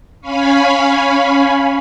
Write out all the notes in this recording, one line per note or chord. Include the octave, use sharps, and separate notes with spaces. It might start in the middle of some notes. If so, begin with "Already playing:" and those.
C#4 C#5 F5 G#5 B5